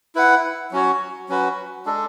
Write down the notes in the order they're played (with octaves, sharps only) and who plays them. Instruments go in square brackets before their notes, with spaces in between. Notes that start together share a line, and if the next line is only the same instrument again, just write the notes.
[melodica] E4 B4 F#5
F#3 C#4 F#4 C#5
F#3 C#4 F#4 B4
G#3 D4 A4